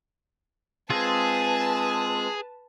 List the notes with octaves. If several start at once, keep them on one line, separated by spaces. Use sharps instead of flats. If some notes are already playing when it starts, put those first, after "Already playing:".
G#3 C4 F4 G#4 B4 A5